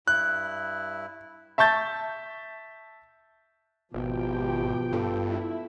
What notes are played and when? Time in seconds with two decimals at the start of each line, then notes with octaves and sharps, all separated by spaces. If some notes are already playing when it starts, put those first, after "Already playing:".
0.08 G2 E4 F#6
1.58 E5 A5 C#6 G6 A6
3.94 G#1 B2 F3 G4 G5
4.92 G2 B3 F4 A4
5.30 E4